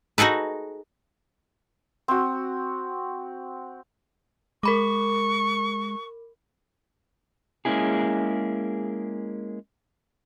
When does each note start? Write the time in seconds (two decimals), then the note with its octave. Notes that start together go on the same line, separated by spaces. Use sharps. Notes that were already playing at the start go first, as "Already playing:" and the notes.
0.18 D#4 F#4 G#4 A4 B4
2.08 C4 F#4
4.63 G#3 A#4 B5 C#6 D6
7.65 G#3 A#3 C4 C#4 E4 G#4